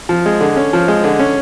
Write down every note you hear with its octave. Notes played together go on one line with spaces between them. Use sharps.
F3
G#3
D3
C#4
F3
G#3
D3
C#4